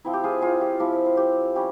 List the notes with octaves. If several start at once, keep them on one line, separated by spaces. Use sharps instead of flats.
F3 C4 E4
G4
F4 G#4
F4 G#4
G4
F3 C4 E4 G4
F4
G4
G3 C#4 G4